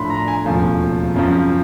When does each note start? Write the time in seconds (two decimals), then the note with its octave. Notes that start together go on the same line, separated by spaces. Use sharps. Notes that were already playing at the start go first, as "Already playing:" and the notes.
Already playing: A2 F3 A3 D4 B5 C6
0.10 A#5
0.28 G#5
0.45 E1 D#2 C#3 F3 A3
1.14 F#2 C#3 F3